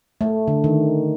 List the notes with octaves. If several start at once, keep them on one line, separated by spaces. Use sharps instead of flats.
A3
D3
D#3